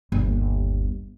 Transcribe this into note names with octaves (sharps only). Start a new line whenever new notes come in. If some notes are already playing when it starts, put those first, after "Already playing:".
G1 D#2